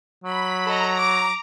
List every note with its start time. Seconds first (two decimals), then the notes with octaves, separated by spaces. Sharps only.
0.24 F#3 B5
0.66 A4 D#5 A#5
0.96 D6